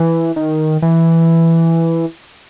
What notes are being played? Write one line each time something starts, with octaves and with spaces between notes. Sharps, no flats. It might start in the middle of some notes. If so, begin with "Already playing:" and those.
Already playing: E3
D#3
E3